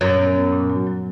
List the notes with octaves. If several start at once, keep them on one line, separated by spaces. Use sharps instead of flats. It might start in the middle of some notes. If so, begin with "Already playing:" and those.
F#2 A#2
B3
B3
A#2
F#3
F#3